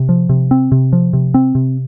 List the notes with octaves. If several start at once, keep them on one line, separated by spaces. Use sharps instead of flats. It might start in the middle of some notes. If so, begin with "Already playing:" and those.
Already playing: C3
F3
C3
C4
C3
F3
C3
C4
C3